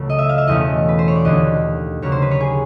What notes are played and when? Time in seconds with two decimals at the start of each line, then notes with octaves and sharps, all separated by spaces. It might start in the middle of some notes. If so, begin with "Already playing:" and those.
Already playing: C#2 C#3 F#3 A3
0.10 D#5
0.18 E5
0.29 F5
0.38 E5
0.47 E2 B2 F#3 A3 C#4 D#5
0.89 B4
0.99 C5
1.08 C#5
1.16 D5
1.25 D#2 D3 F#3 A3 D4 D#5
2.02 D#2 C#3 F#3 A#3 C#5
2.12 C5
2.22 B4
2.31 C#5
2.40 G#4